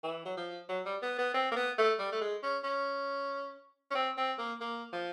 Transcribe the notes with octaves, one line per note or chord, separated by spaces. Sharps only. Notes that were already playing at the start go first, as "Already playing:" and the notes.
E3
F#3
F3
F#3
G3
B3
B3
C4
A#3
B3
A3
G3
A3
G#3
C#4
C#4
C#4
C4
C4
A#3
A#3
F3